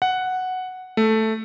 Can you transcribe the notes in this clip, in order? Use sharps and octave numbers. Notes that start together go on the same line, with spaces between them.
F#5
A3